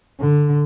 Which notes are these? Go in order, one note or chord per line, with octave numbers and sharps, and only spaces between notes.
D3